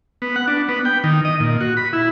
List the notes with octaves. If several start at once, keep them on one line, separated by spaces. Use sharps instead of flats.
B3
F#5
D4
B3
G5
D#3
D#5
A#2
F#4
B5
E4